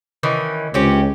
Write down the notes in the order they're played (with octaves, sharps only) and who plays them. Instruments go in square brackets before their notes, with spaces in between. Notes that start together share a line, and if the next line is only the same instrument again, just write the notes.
[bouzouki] D#3 E3 C#4
[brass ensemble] C#2 [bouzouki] C4 C#4 G4